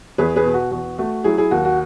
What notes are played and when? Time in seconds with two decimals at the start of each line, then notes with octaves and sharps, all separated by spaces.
0.18 E2 G#4 B4
0.36 G#4 B4
0.45 B2
0.54 F#4
0.71 E2 F#4
0.98 A3 F#4
1.24 F#3 E4 G#4
1.38 E4 G#4
1.51 D#2 F#4
1.65 F#4